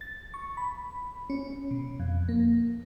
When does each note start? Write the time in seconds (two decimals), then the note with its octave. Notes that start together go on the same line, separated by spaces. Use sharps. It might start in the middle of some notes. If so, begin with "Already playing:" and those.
0.01 A6
0.34 C#6
0.57 B5
1.30 C#4
1.71 B2
2.00 F2
2.29 A#3